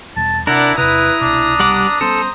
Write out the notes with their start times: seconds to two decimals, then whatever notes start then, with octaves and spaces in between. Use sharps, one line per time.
0.17 E2 B2 G3 A5
0.47 C3 D4 E4 A#4 D5 F#5
0.78 E2 C3 E4 B4 A#5 D#6
1.21 C2 B2 D4
1.60 G3 F#5 D6
2.01 G3 B3 C#4 A4 C5